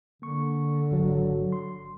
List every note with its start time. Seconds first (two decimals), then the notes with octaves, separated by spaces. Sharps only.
0.22 D3 A#3 C#6
0.91 G#1 F#3
1.52 C6